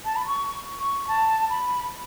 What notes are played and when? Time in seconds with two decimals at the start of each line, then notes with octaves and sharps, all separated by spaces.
0.05 A5
0.16 B5
0.26 C#6
0.80 C#6
1.08 A5
1.49 B5